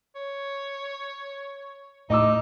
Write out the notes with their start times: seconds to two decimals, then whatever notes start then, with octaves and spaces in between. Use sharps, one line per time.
0.15 C#5
2.10 A2 D#4 D#5 D6 E6